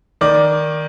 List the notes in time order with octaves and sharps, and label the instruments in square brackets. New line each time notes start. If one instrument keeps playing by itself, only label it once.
[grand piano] D#3 D5